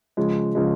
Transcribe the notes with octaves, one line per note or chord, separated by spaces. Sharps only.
C#3 F3 G#3
C#3 F3 G#3